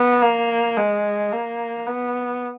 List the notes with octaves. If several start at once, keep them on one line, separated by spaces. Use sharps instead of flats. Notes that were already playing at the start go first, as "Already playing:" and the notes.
Already playing: B3
A#3
G#3
A#3
B3